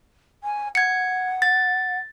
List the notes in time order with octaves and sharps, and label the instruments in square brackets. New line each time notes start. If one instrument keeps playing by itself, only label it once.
[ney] G#5
[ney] F#5 [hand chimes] G#6 C#7
[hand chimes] A6